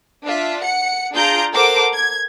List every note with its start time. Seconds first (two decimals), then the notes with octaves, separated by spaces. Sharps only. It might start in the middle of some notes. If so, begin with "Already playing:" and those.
0.24 D4 F4 E5
0.59 F#5 C#7
1.14 D4 F4 G#4 A#5 G6 D7
1.54 A4 A#4 C5 F#5 D6
1.93 G#6